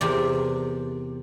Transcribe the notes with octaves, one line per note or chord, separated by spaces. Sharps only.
E2 C3 C4 A#4 D5